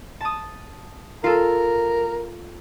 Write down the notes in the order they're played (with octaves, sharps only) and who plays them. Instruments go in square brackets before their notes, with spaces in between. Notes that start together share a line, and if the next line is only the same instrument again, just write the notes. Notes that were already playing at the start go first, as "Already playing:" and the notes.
[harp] A5 D#6
[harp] F4 A4 [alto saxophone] A#4